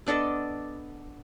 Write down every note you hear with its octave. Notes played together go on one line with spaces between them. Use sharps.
B3 D4 A4 D#5